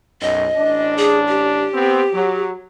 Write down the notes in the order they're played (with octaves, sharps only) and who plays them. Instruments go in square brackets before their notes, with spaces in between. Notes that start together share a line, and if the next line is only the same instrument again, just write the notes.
[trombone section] B1 F#2 [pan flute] D#5
[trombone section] A1 D4
[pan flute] G#4
G4
[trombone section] B3 C4
F#3